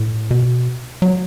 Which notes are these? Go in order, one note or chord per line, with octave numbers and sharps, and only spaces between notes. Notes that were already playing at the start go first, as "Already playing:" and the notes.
Already playing: A2
B2
F#3